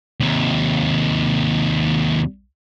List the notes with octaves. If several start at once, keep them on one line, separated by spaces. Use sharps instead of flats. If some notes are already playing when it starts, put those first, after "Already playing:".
D#2 C3